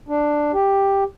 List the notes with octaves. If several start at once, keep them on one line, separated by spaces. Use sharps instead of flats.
D4
G4